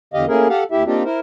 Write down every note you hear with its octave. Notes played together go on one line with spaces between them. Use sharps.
E2 D3 G4 D#5 F5
A3 A#3 C#4 E4 G#4 A#4
G4 A4 F5 F#5
D#2 E4 G4 E5
A#3 C4 D4 D#4 F4 G4
E4 A#4 C5